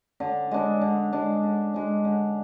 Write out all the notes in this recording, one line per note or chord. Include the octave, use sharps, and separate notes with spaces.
D3
G#3 D4
D3
G#3 D4
D3
G#3 D4
D3